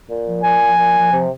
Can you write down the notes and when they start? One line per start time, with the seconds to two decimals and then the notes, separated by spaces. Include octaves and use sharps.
0.09 A#2
0.26 F3
0.43 A#2 G#5
0.61 F3
0.78 A#2
0.96 F3
1.13 C3